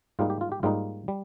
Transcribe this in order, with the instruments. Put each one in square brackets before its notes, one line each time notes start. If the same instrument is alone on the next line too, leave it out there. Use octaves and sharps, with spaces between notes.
[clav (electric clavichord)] G#2 G3 A#3 D#4 F4
G4
F4
G4
G#2 G3 A#3 D#4 F4
G3